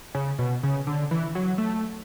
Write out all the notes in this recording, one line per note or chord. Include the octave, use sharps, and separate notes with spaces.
C#3
B2
C#3
D3
E3
F#3
A3